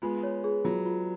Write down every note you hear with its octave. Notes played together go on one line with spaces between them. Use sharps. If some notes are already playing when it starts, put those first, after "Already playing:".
G#3 B3 F4
C#5
G#4
F#3 F4
F4